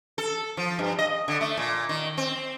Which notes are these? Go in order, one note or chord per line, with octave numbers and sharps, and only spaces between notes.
A4
F3
G2
D#5
D3
A3
A#2
D#3
C4